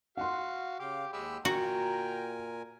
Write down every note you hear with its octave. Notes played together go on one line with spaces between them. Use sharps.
F#4 F5 F#5 C6
C#3 G4 F5 D6
D#2 G#3 G4 B5 E6
A#2 F#4 A#4 G5 G#5 A#5